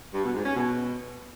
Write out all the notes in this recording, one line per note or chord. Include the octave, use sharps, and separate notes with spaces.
G2
B2
G#2
C#4
B2